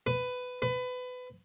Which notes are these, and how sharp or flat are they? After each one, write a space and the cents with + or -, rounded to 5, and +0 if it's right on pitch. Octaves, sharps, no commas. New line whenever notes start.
B4 +15
B4 +25